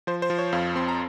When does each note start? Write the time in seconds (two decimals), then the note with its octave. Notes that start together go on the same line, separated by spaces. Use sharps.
0.07 F3 C5
0.22 C5
0.30 F3
0.38 C#5
0.53 F2 F5
0.76 C4 C6
0.88 A#5